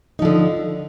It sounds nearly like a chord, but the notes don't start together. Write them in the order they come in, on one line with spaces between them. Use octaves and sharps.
D#4 F3 D3